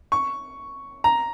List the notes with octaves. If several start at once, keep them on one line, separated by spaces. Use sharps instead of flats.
C#6
A#5